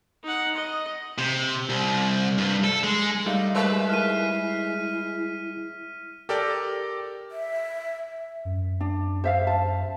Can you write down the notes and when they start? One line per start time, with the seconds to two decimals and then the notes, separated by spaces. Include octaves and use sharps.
0.23 D#4 F#5
0.55 D#5
1.18 C3
1.69 C2
2.38 G2
2.64 A4
2.84 G#3
3.26 G3 A3 D#4 F5
3.55 G#3 A#4 B4 E5
3.90 E4 F6 B6 D#7
6.29 G4 A4 A#4 D5 G5
7.31 E5
8.45 F#2
8.81 D4
9.24 C5 E5 F5
9.47 A5